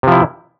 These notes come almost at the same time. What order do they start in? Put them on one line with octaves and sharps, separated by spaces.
C3 F3 E4